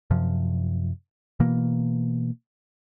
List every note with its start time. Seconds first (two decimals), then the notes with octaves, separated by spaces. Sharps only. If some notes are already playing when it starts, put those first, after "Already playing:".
0.10 F#2 C3 F3
1.40 B2 E3 A#3